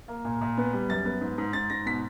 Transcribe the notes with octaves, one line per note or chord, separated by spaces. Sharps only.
A#3
A#2
A#2
B3
G3
F#2 A6
B3
G#2
G#2
G#2 A6
G#2 A#6
B2 B6